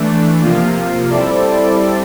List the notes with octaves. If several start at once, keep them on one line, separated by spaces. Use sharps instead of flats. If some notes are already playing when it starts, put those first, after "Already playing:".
Already playing: E3 A3 D4
C3 F3 A#3 F4
G3 C4 E4 A4 D5